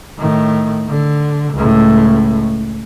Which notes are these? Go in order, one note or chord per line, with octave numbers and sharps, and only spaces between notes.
A2 D#3
D3
C#2 A2